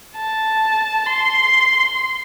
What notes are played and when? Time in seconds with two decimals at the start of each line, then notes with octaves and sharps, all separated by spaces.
0.17 A5
1.07 C6